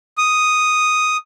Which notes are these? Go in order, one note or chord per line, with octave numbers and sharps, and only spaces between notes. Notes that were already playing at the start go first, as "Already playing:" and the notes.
D#6